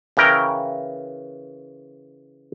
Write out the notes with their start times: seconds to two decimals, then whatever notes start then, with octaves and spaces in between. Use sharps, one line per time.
0.17 C#3 E3 A#4 G5